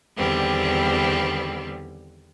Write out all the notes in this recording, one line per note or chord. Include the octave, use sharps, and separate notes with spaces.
E2 D3 D#3 G3 B3 C4